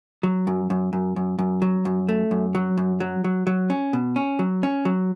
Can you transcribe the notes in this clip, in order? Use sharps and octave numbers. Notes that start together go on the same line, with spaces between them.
F#3
F#2
F#2
F#2
F#2
F#2
F#3
F#2
A3
F#2
F#3
F#2
F#3
F#3
F#3
C#4
B2
C#4
F#3
C#4
F#3